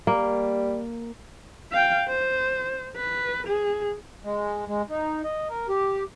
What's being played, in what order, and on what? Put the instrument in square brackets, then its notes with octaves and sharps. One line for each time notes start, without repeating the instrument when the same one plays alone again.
[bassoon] G3 [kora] A#3
[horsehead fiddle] F5 G5
C5
B4
G#4
[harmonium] G#3
G#3
D#4
D#5
A#4
G4